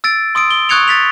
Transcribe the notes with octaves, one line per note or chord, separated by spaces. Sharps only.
E6 A6 D7
C6 D#6 E6 D7
G7
C#6 D#6 F#6 G#6 C#7 F7
A6 B6 F7